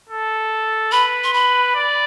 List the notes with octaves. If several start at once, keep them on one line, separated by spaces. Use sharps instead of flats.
A4
B4 B5
C6
B5
D5